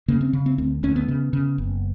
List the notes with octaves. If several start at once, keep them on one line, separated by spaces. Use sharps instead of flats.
C#3 A#3
C4
C#3
C4
D2 C4
D2 C#4
B3
C#3
C#3
F#1